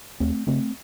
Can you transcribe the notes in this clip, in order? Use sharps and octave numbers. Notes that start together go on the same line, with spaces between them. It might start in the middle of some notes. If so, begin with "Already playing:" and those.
D#2 A3 C4
C#3 A3 C4